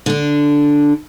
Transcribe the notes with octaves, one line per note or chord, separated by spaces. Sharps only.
D3 D4